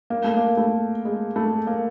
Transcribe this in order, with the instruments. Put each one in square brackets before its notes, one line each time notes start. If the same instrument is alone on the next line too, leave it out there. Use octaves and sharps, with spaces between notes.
[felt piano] A#3
A3
A#3
A3
G#3
A3
A#3